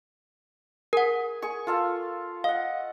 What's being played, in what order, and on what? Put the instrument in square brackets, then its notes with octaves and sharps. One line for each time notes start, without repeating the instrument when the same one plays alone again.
[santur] G#4 [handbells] A#4 F#5
[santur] G#4 C#6
F4 A4 F5
[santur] D#5 F#5 [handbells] F5